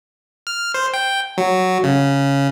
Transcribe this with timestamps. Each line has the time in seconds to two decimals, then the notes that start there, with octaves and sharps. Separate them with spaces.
0.47 F6
0.74 C5
0.93 G5
1.38 F#3
1.83 C#3